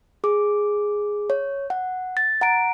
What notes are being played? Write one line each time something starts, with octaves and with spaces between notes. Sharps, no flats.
G#4 D6
C#5
F#5
A6
F#5 A#5 D7